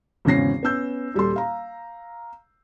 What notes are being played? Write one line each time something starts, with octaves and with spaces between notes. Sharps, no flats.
G#1 E2 C#3 C#4 A#6 C7
B3 C#4 E6 G6
D#1 G3 A4 C6
F5 A#5